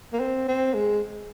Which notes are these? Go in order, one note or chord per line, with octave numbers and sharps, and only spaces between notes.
A#3
C4
C4
G#3